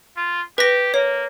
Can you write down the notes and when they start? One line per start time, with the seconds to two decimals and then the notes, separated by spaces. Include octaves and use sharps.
0.17 F4
0.58 G4 B4 A#6
0.94 A#3 C#5